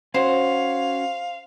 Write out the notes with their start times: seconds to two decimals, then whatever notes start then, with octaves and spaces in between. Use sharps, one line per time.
0.14 C#4 F#4 C5 F5